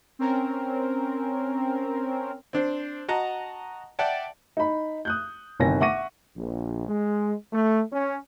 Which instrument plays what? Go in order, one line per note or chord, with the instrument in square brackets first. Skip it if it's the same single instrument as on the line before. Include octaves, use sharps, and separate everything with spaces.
[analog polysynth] C4 C#4 A#4
[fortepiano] C4 D4 C5
F#4 D#5 F#5 A5 A#5
D5 E5 F#5 G5 A5
[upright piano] D#4 B5
D#6 F#6 G6
G1 C3 D#3 G#5 A#6
E5 F#5 C#6 D6 A#6 D#7
[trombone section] A#1
G#3
A3
C#4